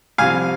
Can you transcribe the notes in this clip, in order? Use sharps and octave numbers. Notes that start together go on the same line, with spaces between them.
C2 C3 F3 F5 G#5